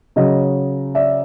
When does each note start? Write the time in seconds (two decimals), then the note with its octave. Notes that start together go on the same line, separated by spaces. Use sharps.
0.16 C#3 F#3 D#5
0.95 D5 E5